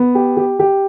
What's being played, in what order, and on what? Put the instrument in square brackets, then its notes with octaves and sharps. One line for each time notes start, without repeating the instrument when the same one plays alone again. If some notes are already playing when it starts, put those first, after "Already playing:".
Already playing: [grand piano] B3
G4
G4
G4